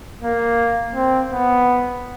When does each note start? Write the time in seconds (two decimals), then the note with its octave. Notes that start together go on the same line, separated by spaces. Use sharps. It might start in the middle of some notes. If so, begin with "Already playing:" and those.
0.22 A#3
0.95 C4
1.31 B3